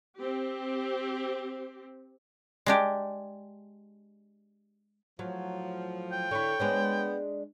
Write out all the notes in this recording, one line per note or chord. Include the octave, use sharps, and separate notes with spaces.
C4 G4
G#3 D4 G4
A2 F3 F#3
G5
D3 E4 C#5
G#3 B3 D4 C#5